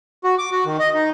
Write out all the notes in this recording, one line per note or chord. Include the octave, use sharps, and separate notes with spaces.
F#4
D6
F#4
D#3
D#5
D#4